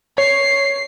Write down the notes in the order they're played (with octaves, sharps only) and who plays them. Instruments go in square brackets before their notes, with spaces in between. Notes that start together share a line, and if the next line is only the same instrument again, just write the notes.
[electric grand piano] C#5 [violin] C7